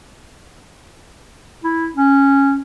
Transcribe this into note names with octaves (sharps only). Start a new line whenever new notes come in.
E4
C#4